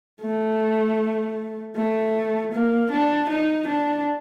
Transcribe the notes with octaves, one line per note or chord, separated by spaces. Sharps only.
A3
A3
A#3
D4
D#4
D4